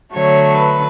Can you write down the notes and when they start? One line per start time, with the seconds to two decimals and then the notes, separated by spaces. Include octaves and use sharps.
0.13 D3 F#3 A3 C#5
0.57 B4